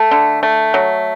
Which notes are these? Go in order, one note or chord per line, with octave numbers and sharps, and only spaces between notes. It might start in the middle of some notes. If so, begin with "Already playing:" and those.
Already playing: A3 A4
D3
A3
F#3